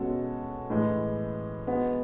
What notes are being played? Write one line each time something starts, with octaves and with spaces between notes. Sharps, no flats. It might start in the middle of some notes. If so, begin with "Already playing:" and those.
Already playing: B2 G#3 C#4 F#4 A4
A2 E3 G#3
G#3 B3 F#4